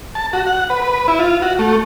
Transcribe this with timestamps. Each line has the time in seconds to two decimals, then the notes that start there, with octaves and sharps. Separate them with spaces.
0.15 A5
0.33 F#4
0.47 F#5
0.70 B4
0.82 B4
1.08 E4
1.19 F4
1.42 F#4
1.59 A3